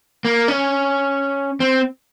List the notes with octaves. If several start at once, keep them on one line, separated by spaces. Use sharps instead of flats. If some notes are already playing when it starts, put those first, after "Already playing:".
A#3
C#4
C4